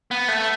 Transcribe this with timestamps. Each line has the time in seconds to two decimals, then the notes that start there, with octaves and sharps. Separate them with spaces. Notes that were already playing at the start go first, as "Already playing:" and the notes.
0.11 B3
0.28 A3